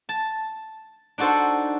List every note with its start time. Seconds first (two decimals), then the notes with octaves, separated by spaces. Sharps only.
0.09 A5
1.18 D4 D#4 F#4 A4 C5